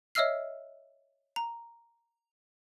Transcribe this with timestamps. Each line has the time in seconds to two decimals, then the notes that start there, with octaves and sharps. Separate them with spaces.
0.15 C#5 D#5 E5 E6 F6 C7
1.36 A#5